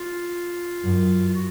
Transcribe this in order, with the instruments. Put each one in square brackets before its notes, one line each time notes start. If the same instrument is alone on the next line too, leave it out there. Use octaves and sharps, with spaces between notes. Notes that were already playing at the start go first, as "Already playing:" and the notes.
Already playing: [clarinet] F4
[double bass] F#2
[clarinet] F4
F#4